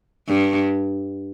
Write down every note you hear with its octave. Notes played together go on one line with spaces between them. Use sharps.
G2